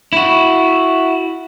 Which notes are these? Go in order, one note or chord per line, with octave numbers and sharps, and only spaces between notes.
E4 F#4